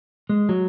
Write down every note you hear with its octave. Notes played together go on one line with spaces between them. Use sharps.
G#3
F#3